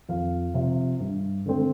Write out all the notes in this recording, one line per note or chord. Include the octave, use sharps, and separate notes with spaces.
F2 F5
C3 F3
G2
D3 A3 C4